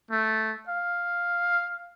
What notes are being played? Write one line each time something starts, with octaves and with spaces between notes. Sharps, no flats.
A3
F5